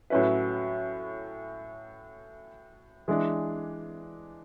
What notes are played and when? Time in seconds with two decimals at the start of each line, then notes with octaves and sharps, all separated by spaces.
0.10 A2 F#3 C#4 E4 B4
3.08 E3 G#3 D4